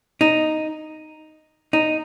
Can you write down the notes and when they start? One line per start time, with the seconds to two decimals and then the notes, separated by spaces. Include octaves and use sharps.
0.21 D#4
1.73 D#4